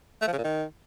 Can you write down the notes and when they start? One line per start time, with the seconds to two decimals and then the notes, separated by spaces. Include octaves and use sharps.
0.22 A3
0.27 F3
0.33 C#3
0.38 A#2
0.44 D#3